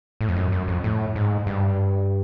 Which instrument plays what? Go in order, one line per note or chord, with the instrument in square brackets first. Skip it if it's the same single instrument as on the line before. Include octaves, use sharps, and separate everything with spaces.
[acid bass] A2
F2
F#2
F#2
F2
A2
G#2
G2